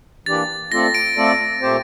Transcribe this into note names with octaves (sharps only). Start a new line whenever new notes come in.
E3 A#3 D4 G4 D5 A6
A3 C4 F4 A4 D5 A#6
D7
A3 C4 F4 A4 D5
A#2 A3 C4 G4 C5